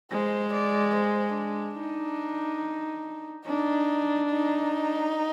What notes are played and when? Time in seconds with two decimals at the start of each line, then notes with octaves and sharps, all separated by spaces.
0.11 G#3 C5
0.53 D5
0.95 C5
1.36 D4
1.79 D#4
3.46 D4 D#4
4.30 D#4